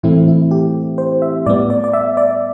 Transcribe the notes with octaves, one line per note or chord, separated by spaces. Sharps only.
A2 E3 A3 C4 E4
E4
G4
C5
E5
A2 G3 B3 D5
D5
D5
E5
D5